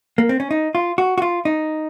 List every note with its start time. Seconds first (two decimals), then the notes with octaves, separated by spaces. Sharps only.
0.18 A#3
0.29 C4
0.40 C#4
0.51 D#4
0.75 F4
0.98 F#4
1.18 F#4
1.22 F4
1.45 D#4